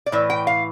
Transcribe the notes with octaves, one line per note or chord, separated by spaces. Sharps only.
D5
A2 E3
G5
F5